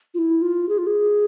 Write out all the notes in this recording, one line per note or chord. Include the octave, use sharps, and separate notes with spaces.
F4
E4
F4
G#4
F4
G#4